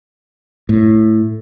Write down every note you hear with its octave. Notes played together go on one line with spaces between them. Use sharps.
A2